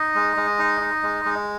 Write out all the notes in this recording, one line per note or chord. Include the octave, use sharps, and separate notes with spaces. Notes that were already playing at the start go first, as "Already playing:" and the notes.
Already playing: D#4 D#5
G#3
G#3
D#4
D#4
G#3
G#3